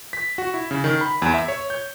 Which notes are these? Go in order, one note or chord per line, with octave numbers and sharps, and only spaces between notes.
B6
F#4
E4
C#3
D#3
B5
E2
E5
C#5
G6